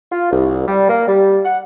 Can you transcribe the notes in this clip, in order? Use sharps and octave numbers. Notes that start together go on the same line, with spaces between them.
F4
C2
G3
A#3
G3
F#5